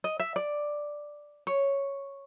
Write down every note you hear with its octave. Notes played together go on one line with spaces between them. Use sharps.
D#5
E5
D5
C#5